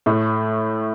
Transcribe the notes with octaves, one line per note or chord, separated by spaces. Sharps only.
A2 A3